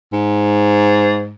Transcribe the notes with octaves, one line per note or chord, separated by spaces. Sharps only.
G#2